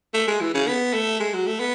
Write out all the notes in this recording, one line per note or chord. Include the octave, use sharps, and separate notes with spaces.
A3
G#3
E3
C#3
B3
A3
G#3
F#3
A3
B3